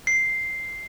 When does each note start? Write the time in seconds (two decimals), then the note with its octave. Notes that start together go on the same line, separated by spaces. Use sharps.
0.07 C7